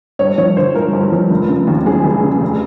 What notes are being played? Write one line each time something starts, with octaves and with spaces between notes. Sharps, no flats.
G2 C#5
F3 C#5
D3 C5
G#3 A#4
G2
F3
F1
C#3
D#2
F#3 G#4
F1
C#3
F1